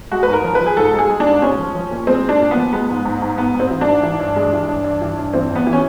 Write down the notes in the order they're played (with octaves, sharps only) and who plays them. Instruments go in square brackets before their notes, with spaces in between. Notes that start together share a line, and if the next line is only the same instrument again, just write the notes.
[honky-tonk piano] G#3 F#4
B4
G#2
A#4
F3
B4
F3
G#4
G#2 A4
G#3
G#4
G#3
D4
G#2
G#3 C#4
F3
F3
A#2
G#3 C4
G#3
D4
A#2
B3
F3
G#3 B3
G#2
G#2
G#2
G#2 B3
G#2
C4
E3
D4
G#2
E3
G2
G#3
E3
G2
G2
E3
G2
E3 C4
E2
B3
E3
C#4